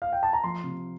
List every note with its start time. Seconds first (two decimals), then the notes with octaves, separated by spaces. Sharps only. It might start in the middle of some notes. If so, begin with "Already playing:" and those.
0.02 F5
0.13 G5
0.23 A5
0.33 A#5
0.44 F3 C6
0.64 C3